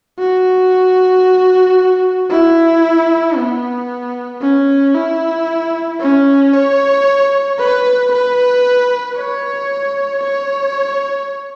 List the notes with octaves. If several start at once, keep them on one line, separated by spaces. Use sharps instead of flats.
F#4
E4
B3
C#4
E4
C#4
C#5
B4
B4
C#5
C#5